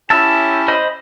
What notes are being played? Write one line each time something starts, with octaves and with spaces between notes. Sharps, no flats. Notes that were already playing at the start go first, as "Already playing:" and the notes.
C#4 E4 G4 A5 E6
C5 D#5 B5